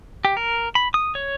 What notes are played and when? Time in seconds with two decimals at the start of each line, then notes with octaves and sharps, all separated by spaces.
0.25 G4
0.37 A#4
0.75 B5
0.94 D#6
1.15 C#5